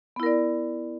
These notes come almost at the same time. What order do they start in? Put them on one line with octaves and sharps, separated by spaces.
B3 E4 A#4 D5